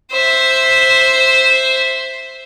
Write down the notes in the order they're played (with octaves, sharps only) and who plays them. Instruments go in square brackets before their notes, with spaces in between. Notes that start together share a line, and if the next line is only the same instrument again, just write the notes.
[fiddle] C5 E5